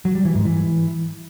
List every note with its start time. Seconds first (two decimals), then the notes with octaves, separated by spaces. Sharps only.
0.05 F#3
0.15 G3
0.25 E3
0.35 G#2
0.45 E3